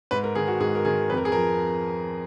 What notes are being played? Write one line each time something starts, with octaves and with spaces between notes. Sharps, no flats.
G#2 B4
A#4
D#3 G#4
F#4
G#2 G#4
A#4
D#3 G#4
F2 B4
A#4
G#4
F3 A#4